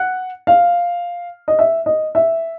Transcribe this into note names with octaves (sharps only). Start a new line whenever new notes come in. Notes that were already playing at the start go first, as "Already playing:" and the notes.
Already playing: F#5
F5
D#5
E5
D#5
E5